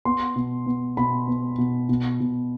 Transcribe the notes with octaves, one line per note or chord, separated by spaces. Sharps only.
B3 C6
B2
B3
B2 B5
B3
B2
B2
B2